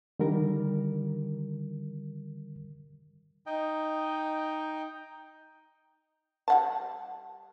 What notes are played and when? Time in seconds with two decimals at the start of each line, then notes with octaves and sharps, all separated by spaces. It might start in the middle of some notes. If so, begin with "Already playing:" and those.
0.20 D3 D#3 G3 A#4
3.46 D#4 D#5 G5
6.48 G3 F#5 A5